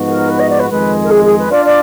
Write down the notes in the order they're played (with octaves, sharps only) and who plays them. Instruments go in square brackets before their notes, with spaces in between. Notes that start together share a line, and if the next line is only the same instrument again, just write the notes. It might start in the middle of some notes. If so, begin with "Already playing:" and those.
Already playing: [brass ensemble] G#2 F3 B3 D#4 F#4
[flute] A#4
B4
D#5
D5
B4
[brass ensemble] F2 D#3 G#3 [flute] B4
[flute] A#4
G#4
G#4
B4
[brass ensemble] D4 F4 [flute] D5
[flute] D5